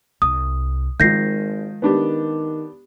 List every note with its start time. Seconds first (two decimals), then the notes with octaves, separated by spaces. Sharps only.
0.22 C2 D#6
1.00 G#1 D#3 F3 G#3 G6 A#6 C7
1.82 D#3 B3 D4 G4